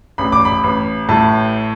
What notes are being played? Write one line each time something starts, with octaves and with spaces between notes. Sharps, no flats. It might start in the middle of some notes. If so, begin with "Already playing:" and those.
A1 B5
D6
B5
A1
A2 A5